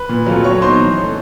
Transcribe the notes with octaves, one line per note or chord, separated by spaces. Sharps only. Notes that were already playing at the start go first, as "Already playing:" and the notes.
Already playing: B4
A#2
F#3 A3 C4 F4
F#3 C#5 C#6
B3 D#4 C5 C6
E3
A3 C#4